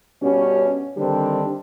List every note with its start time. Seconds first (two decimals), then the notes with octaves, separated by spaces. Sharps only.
0.22 G2 B2 G3 C#4
0.97 D3 D#3 G3 C4 D4